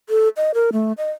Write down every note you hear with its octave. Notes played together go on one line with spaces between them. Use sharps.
A4
D#5
A#4
A3
D#5